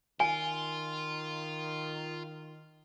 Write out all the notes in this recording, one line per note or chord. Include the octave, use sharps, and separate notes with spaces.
D#3 F4 G#5